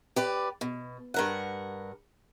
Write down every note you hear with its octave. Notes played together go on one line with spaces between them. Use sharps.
G4 B4 D5
B2
G2 A#4 F#5